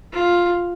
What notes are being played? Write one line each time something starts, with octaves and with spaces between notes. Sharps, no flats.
F4